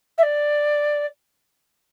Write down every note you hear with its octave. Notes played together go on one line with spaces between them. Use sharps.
E5
D5